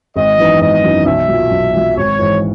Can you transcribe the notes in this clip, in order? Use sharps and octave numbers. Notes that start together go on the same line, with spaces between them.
G#1 D#5
F#2 E3 B3 D#4
G#1 D#5
F#2 E3 B3 D#4
B1 E5
A#2 F#3
B1
A#2 F#3
G#1 C#5
G#2 E3